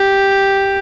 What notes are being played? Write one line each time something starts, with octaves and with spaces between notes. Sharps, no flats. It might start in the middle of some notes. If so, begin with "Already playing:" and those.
Already playing: G4